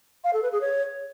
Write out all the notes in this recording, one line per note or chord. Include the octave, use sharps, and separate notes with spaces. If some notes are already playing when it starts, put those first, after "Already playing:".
F5
A4
B4
G#4
C#5